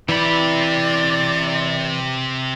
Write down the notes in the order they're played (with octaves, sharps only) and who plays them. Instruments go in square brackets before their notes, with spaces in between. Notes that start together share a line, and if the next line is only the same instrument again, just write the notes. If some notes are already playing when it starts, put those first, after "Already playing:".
[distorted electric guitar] C3 G4 [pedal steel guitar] E3 B5 [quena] D5